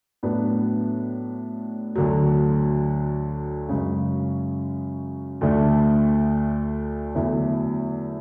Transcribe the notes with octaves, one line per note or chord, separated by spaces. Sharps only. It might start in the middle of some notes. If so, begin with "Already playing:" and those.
A2 F#3 B3 D4
D2 D3 F#3
F#2 C#3 G#3
D2 D3 A3 D4
E2 D3 F#3 A3 E4